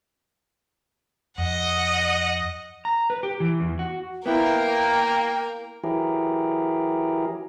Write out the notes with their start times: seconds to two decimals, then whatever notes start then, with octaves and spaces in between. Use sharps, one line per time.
1.38 F2 D#5 F#5
2.85 A#5
3.10 B4
3.23 G4
3.40 E3
3.60 E2
3.79 F#4
4.26 A#3 B3 E4 A#4 G5
5.84 E3 F#3 E4 G4 G#4 A#4